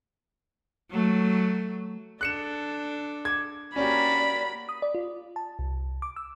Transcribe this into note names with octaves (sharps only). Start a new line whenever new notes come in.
F#3 A3
D4 A4 F#6 C#7 E7
D6 G#6
A#3 C#4 F#4 G4 A#4 D5 B5
D#6
D5
F4
A5
C2
D6
E6